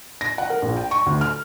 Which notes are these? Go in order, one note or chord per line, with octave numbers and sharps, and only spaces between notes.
A#6
F#5
A#4
A#1
G5
C#6
D2
F6